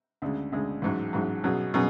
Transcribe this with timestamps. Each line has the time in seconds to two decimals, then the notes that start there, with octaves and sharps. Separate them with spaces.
0.22 D2 C#3 G#3
0.52 D2 C#3 G#3
0.82 A1 G#2 F#3
1.13 A1 G#2 F#3
1.44 B2 F#3 C#4 G#4
1.74 B2 F#3 C#4 G#4